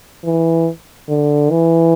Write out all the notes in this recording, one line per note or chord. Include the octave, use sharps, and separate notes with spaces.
E3
D3
E3